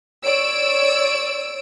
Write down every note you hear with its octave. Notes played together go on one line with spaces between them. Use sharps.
C#5 D5 E6 D7